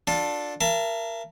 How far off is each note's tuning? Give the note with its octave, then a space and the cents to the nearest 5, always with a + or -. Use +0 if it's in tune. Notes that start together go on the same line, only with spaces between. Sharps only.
D4 +0 F4 +35 A4 +0
A#4 +0 E5 +40 A5 +0